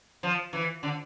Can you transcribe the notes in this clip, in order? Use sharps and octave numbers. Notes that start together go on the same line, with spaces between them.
F3
E3
D3